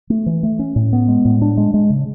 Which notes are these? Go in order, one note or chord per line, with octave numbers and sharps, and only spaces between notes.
A3
E3
A3
C#4
A2
B3
G#3
A2
D4
G#3
G#3
C#3